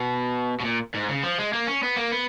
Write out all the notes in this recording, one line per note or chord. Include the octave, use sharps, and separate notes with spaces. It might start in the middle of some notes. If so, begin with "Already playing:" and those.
Already playing: B2
B2
A#2
G#2
C#3
F3
G#3
A#3
C#4
B3
A#3
B3